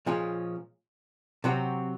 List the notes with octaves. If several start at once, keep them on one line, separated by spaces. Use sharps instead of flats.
A#2 F3 G#3 C#4 G#4
C3 F#3 C4 F#4